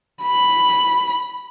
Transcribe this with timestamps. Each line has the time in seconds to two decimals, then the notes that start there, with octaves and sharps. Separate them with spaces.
0.23 B5